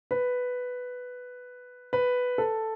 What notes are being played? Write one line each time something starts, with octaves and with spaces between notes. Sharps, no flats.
B4
B4
A4